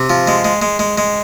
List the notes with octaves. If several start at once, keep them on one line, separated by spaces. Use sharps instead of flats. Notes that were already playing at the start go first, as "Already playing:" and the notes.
Already playing: C3
F3
G#3
G#3
G#3
G#3
G#3